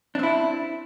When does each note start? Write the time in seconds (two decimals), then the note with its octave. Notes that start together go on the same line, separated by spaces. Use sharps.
0.15 D4
0.19 C4
0.23 E4